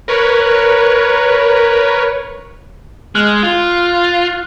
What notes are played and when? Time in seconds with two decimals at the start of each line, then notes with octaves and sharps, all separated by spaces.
0.08 A#4 B4 C#5
3.15 G#3 F6 F#6
3.43 F4